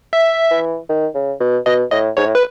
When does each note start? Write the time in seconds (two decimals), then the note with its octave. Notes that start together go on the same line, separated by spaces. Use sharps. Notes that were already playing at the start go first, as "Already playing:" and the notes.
0.13 E5
0.51 E3
0.89 D#3
1.15 C#3
1.40 B2
1.66 B2 D#5
1.91 A2 D#5
2.17 G#2 C#5
2.25 A2
2.35 B4